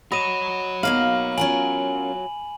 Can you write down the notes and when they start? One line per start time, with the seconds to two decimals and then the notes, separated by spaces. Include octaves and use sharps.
0.12 F#4 C#5 D#5 B5 D#7 E7
0.83 B2 A#3 D#4 F5 F#7
1.38 C#4 F4 A#4 G#5 F#7